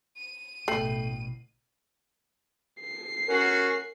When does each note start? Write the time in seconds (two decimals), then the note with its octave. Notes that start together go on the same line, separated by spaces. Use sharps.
0.16 D#7
0.68 A1 B2 A3 G5 C7 F#7
2.82 C7
3.28 C#4 F#4 A#4